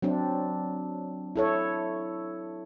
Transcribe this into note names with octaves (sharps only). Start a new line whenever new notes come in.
F#3 C4 D4
E4 A4 C#5